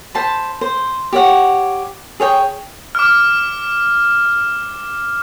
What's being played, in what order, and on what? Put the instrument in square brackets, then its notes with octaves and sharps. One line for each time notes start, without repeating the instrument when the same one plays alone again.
[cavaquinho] C5 A5 B5
C5
G4 C#5 F#5
G#4 C#5 G5
[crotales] D6 F6